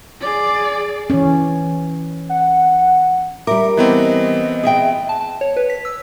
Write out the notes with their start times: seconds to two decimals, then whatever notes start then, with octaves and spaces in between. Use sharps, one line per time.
0.21 G#4 D5
1.10 E3 C#4
2.29 F#5
3.47 G3 A#4 E5 D6
3.77 E3 B3 C4 D#5
4.63 G#4 E5 G5
5.09 A5
5.21 A5
5.41 C#5
5.56 B4
5.70 B6
5.85 E6